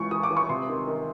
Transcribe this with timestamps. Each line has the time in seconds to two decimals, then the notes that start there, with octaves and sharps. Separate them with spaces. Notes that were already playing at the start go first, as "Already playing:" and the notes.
Already playing: C#2 E3 C#6
0.11 E3 D#6
0.23 D6
0.30 E3
0.37 C#6
0.49 C3 C6
0.69 D#3
0.87 D#3